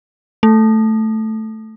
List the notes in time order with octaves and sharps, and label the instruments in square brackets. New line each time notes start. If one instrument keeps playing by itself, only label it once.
[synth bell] A3